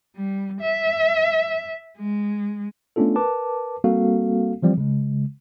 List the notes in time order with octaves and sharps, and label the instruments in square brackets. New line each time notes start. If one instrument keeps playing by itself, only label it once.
[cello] G3
E5
G#3
[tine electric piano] A3 B3 C#4 D4 F4 A4
A#4 B4 A5 D6
G3 A#3 C4 F#4 A4 F5
E3 F3 G3 C4
C#3 G#3